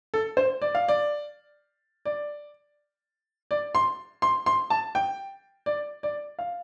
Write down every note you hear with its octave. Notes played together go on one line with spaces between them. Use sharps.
A4
C5
D5
F5
D5
D5
D5
C6
C6
C6
A5
G5
D5
D5
F5